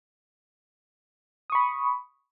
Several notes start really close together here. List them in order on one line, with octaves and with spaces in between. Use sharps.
D#6 C#6 B5